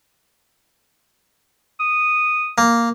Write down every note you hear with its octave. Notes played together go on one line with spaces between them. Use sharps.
D#6
A#3